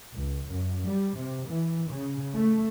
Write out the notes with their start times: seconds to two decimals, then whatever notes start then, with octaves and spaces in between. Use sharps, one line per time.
0.13 C#2
0.47 F#2
0.86 G3
1.17 C3
1.49 E3
1.89 C#3
2.33 A3